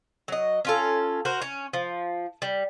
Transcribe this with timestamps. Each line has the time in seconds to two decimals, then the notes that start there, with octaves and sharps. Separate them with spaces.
0.28 F#3 D#5
0.65 C#4 F4 A4
1.25 F#4 A#4 C5
1.42 C#4
1.73 F3
2.42 G3